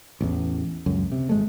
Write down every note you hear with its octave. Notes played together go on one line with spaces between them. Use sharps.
A1 E2
C#2 F#2
C3
G#1 G#3 A3